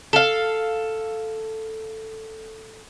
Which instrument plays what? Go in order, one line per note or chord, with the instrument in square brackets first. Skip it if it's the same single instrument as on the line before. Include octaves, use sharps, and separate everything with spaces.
[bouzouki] A4 F5